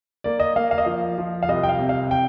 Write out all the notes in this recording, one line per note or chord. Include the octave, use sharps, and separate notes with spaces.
A#3 D5
D#5
A#3 F5
F5
D#5
F3 F5
F3
F5
C2 D#5
G5
F5
C3
F5
G5